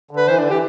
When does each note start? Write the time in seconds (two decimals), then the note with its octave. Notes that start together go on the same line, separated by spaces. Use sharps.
0.11 D3
0.17 B4
0.27 E3 C5
0.38 D3 D4
0.50 E3 G4